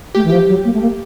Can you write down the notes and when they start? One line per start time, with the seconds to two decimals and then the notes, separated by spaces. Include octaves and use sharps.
0.15 A3 G4
0.24 E3
0.30 F3 G4
0.48 F#3
0.65 A#3
0.74 A3
0.81 A#3